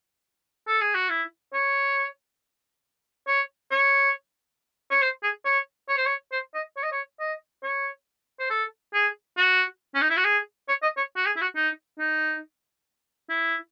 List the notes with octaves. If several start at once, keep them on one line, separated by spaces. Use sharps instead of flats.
A4
G#4
F#4
E4
C#5
C#5
C#5
C#5
C5
G#4
C#5
C#5
C5
C#5
C5
D#5
C#5
D#5
C#5
D#5
C#5
C5
A4
G#4
F#4
C#4
D#4
E4
F#4
G#4
C#5
D#5
C#5
F#4
G#4
E4
F#4
D#4
D#4
E4